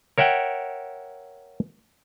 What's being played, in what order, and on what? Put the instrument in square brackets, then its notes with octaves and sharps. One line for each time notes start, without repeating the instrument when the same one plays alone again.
[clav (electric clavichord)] A#4 C#5 E5 F#5 G5